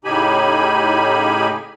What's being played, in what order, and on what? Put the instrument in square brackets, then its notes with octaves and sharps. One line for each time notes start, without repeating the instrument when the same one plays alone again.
[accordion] A2 C#3 D#4 G4 G#5 B5